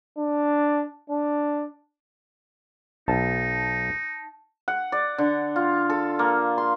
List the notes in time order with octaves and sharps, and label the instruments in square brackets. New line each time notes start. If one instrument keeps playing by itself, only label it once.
[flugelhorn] D4
D4
[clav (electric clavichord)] B1 [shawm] D#4 [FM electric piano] A5
[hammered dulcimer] F#5
D5
D3
F4
A4
A#3
C6